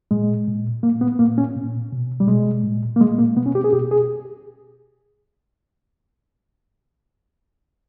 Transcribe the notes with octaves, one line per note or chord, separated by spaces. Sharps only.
A#2 G#3
A#2
A#2 A#3
B3
A#2 A#3
C#4
A#2
B2
G3
B2 G#3
A#2
A#3
A#2 G#3
A#3
B2 B3
C#4
G4
G#4
B2 G4
G#4